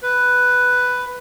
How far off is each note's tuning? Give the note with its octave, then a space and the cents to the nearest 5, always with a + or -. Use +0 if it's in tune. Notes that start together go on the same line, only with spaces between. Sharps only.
B4 +5